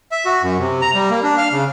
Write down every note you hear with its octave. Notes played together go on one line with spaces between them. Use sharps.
E5
F#4
F#2
C3
A#5
G3
A#3
D4
F5
C#3